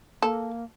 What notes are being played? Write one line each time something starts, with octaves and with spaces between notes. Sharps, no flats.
A#3 A4